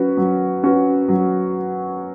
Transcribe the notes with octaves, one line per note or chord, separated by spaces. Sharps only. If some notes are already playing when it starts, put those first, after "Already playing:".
Already playing: F#3 C#4 F#4 B4
F#3
C#4 F#4 B4
F#3